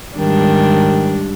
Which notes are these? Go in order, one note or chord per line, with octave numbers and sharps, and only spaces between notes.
G#2 D#3 G3 D4